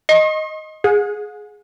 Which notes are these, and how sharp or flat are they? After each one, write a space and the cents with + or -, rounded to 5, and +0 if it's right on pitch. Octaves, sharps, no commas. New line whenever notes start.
D#5 +0 C6 +45
G#4 +0 F#5 -45